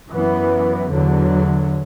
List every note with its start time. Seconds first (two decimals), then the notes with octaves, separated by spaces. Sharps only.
0.10 F#2 E3 B3
0.90 E2 D3 F#3